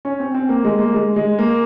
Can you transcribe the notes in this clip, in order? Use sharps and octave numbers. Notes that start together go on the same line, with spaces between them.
C#4
C4
C4
A#3
G#3
A#3
G#3
G#3
A#3